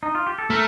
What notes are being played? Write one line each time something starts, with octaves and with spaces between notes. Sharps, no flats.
D#4
F4
G4
A4
A3 A#4